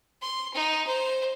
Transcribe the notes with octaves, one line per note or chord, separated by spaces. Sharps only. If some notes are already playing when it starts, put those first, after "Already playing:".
C6
D#4
C5